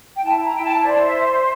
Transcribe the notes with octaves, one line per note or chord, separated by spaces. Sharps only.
G5
E4 A5
A#5
E4 G5
A5
C5 D5
E5